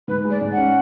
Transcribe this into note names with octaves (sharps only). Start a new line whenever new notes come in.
G#2 B4
G#3
D5
G#2
F#5
C#4